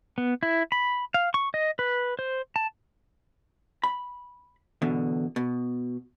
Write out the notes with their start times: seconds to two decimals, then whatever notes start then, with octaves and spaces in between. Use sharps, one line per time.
0.18 B3
0.43 E4
0.72 B5
1.14 F5
1.34 C#6
1.54 D#5
1.79 B4
2.19 C5
2.56 A5
3.84 B5
4.82 E2 B2 D3
5.36 B2